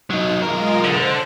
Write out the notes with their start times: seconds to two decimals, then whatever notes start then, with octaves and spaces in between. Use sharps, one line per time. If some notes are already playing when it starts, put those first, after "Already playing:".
0.10 F#3 D#4 D#6
0.42 B1 G#3 F4 A#4 D#5
0.85 D3 C5